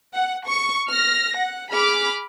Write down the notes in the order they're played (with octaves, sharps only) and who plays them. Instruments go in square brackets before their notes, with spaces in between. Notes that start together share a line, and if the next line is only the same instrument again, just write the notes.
[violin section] F#5
C#6
F6 A#6
F#5
G#4 B5 D6 F6